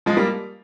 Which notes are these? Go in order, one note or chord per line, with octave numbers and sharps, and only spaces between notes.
F3 G#3
G3 A#3